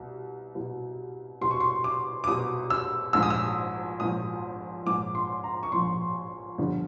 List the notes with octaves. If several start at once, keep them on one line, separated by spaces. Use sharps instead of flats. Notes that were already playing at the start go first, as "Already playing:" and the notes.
Already playing: C2 B2
C2 B2
C2 B2 C6
C#6
C6
D6
D6
C2 B2 D#6
E6
A#1 G#2 F3 E6
D#6
E6
A#1 G#2 F3 D#6
A#1 G#2 F3 D6
C6
A#5
C#6
A#1 G#2 F3 C6
G1 G2 D3 F3